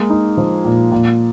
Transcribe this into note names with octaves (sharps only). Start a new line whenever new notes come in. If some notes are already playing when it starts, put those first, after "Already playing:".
Already playing: G#3 A#3
D#4
F3
A#2
A#2